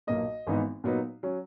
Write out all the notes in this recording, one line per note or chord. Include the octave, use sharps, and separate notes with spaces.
B1 A#2 A#3 D#5
G#1 G#2 E3 B3 D#4
A#2 F#3 B3 D#4
F#3 C#4